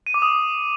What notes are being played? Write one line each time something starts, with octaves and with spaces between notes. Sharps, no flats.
D#7
D6
D#6